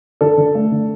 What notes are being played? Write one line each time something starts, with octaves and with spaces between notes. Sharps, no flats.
D3 A4
D3
A3
D3